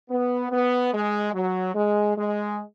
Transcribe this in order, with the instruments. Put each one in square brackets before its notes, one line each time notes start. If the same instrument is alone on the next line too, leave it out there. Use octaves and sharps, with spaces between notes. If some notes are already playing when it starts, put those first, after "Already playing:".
[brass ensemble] B3
B3
G#3
F#3
G#3
G#3